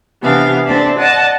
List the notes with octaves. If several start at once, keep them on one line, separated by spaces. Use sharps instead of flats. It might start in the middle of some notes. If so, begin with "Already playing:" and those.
C3 E3 B3 D4 F5
C4 D4 A4 D5 E5
D5 D#5 F#5 A5